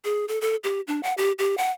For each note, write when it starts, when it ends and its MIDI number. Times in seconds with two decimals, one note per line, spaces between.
0.04 0.25 68
0.28 0.39 69
0.41 0.56 69
0.64 0.81 67
0.87 1.01 62
1.03 1.14 78
1.18 1.32 67
1.39 1.57 67
1.58 1.71 78